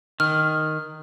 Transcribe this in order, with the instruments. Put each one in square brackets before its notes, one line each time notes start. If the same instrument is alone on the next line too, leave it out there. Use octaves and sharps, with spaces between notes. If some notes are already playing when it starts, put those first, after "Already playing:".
[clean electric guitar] D#3 [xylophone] F6